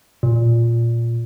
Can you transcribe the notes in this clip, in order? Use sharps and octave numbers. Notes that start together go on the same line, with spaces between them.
A#2